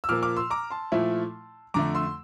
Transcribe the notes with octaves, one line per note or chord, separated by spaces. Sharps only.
E6
A#2 F3 A#3 D6 F6
D6 F6
C6 E6
A#5 D6
A5 C6
A#2 F3 A3 E4
F2 D3 A3 A#5 D6
C6 E6